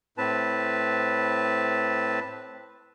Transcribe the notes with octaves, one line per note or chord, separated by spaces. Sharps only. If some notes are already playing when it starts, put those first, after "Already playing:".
A2 C4 B4 A5